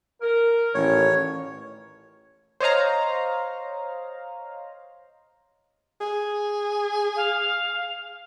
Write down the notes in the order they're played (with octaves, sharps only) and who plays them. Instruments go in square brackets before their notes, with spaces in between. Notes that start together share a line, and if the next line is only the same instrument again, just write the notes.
[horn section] A#4
[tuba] A1 [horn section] A#2 D#3 [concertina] C#5
[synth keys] C5 C#5 D#5 F5 A#5
[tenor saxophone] G#4
[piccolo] F5